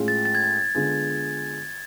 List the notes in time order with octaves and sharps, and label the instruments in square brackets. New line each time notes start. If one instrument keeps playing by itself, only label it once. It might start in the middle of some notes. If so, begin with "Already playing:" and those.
Already playing: [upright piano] A2 G#3 C#4 F4 G#4
[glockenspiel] A6
A6
G#6
A6
[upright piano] D3 G#3 B3 F4 G#4